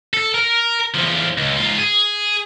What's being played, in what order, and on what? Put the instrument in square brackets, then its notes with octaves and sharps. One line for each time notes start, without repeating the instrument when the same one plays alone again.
[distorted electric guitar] A4
A#4
E2 F3
C#2
G#2 F4
G#4